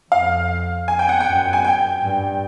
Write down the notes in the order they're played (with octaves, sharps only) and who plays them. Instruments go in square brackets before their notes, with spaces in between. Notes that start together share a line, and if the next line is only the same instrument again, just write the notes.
[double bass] F2 [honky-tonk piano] F5
[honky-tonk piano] G#5
G5
F#5
G5
[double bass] F#2
[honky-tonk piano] G#5
G5
[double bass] G2